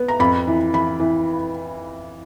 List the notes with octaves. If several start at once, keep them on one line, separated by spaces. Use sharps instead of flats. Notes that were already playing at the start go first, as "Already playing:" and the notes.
Already playing: B3
A#5
F2 B5
E3
E3 B5
E3